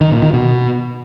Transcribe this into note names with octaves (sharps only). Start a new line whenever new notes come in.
D#3
A#2
D#3
B2